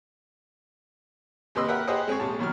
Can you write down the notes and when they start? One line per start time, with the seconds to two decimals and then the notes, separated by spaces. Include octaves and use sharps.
1.55 D#2 C3 B4 D#5 C6 E6
1.69 G4 A#4 B4 E5 F#5
1.87 G4 G#4 B4 C5 D#5 F#5
2.08 G#3 C4 G#4 C#5
2.20 A#1 C3 C#5 A5
2.39 B2 D#3 F#3 F6